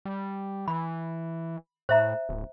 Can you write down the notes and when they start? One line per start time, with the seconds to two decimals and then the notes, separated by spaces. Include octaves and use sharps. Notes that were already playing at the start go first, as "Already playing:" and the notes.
0.05 G3
0.68 E3 B5
1.89 A2 C5 E5 A#5
2.29 D1